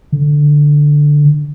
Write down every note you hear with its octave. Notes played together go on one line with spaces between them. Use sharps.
D3